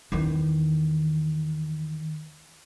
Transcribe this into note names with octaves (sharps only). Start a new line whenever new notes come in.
E2 D#3